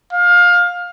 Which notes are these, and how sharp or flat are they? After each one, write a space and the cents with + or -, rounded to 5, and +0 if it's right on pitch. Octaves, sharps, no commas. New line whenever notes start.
F5 +20